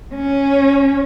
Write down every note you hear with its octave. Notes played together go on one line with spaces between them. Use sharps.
C#4